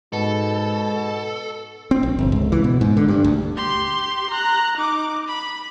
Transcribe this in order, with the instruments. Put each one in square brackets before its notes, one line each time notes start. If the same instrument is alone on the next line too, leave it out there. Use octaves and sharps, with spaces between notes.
[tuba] G#2 [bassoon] B2 [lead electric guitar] A4
[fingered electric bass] C4
A#1
G1
C#2
E3
B2
G#2
D3
G2
D2
[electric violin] G4 C6
A#5 F#6
D#4 D6
B5